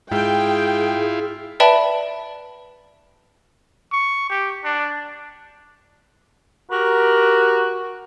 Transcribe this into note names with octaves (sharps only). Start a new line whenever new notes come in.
G#2 E4 F4 G#4 G5
B4 D5 E5 G5 A5 B5
C#6
G4
D4
F#4 G4 A#4